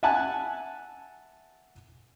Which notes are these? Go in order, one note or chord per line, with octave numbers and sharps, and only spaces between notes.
E5 F#5 G#5 A5 F#6